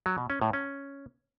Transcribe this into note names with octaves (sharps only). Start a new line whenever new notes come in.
F#3
B2
C#4
A2
C#4